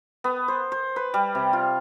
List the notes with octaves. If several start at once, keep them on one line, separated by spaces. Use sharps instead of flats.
B3
C5
C5
B4
G3
C3
F4